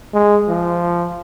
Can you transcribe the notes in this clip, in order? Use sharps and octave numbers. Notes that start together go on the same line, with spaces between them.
G#3
F3